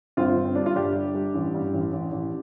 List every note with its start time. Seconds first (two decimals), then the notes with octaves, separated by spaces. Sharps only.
0.17 G1 C4 F4
0.37 G1
0.45 C4
0.55 G2 D4
0.66 F4
0.75 G1 D4 G4
0.96 G3
1.14 G3
1.35 A1
1.54 G2
1.73 A1
1.93 A1
2.12 A1